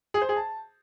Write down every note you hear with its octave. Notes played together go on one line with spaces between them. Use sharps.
G#4
C5
G#4
A5